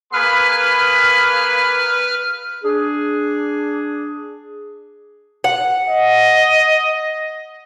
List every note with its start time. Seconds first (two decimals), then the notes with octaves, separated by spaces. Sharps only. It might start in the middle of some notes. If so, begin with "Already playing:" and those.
0.13 A#3 G#4 B4 B5 F6
2.63 D4 G#4
5.44 F#5
5.89 D#5